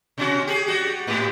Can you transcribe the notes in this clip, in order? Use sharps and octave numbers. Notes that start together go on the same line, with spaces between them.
B2 C#4 F#4
G4 G#4
G3 F#4 G4
G#2 A#3 G4